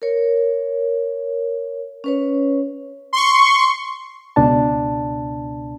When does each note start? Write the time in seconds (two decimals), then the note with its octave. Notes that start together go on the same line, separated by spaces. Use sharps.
0.02 A#4 C#5
2.04 C#4 B4 C#5
3.13 C6 C#6
4.36 C#2 B2 D4 A5